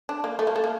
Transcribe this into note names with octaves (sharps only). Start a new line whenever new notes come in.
D4
A#3
A3
A#3
A3
A#3